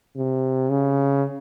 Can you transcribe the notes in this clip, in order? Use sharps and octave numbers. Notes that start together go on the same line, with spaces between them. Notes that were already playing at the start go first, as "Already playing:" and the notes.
C3
C#3